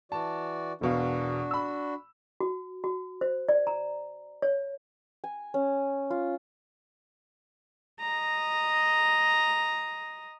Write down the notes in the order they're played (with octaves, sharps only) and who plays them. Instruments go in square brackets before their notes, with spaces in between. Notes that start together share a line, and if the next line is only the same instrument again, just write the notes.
[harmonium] E3 F#4 D5 [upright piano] A5
[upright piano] E1 B2 F5 [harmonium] D4 F#4
[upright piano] B5 E6
[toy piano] F#4
F#4
C5
D5
A#5
C#5
[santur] G#5
C#4
F4
[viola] D#5 A#5